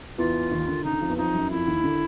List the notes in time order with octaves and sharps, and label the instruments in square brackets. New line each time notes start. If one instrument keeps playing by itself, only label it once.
[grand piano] E2 E3 [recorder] F4
[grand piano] D#2 D#3
D3
[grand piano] C#3 [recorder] D#4
[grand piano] D3
F2 F3
E2 E3
[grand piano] F2 F3 [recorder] D#4
[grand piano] F#2 F#3
[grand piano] F2 F3 [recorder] E4
[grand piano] D#2 D#3
D3